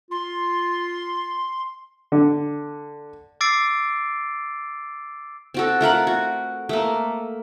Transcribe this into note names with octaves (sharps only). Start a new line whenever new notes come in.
F4 C6
D3
D6 E6 A6 C7 D7
C4 F#4 A4
A3 F4 A#4 F#5
F#4
A3 A#3